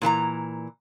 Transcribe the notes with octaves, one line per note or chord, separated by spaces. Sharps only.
A#2 E3 A5 A#5